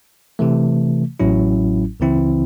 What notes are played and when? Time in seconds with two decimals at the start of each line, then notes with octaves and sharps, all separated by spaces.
0.39 C3 E3 A3
1.20 A1 A2 F#3 C#4 E4
2.00 C#2 C#3 E3 C4 E4